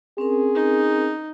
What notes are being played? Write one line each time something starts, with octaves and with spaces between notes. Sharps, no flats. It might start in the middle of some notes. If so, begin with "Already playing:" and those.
C4 C#4 G#4 A#4
D#4